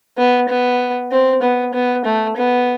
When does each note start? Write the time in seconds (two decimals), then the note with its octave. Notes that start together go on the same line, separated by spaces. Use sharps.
0.17 B3
0.49 B3
1.11 C4
1.42 B3
1.74 B3
2.05 A3
2.37 B3